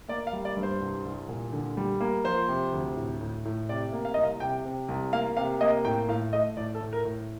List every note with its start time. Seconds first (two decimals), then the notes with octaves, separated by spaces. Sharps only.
0.08 A#3 D5
0.27 F5
0.33 G3
0.45 D5
0.57 G2
0.63 C5
0.81 C2
1.05 C2
1.29 A#2
1.52 D3
1.77 G3
2.01 A#3
2.24 F3 C5
2.48 C3
2.72 D2
2.97 A2
3.21 A2
3.45 A2
3.69 C3 D5
3.93 A#3
4.05 F5
4.14 C2 D#5
4.23 F5
4.40 C3 G5
4.65 C3
4.88 C2
5.13 A#3 F5
5.37 C3 F5
5.61 A#3 D#5
5.85 A2 G5
6.08 A2 F5
6.33 A3 D#5
6.57 A2 D5
6.75 A4
6.81 A2
6.93 A#4
7.05 A2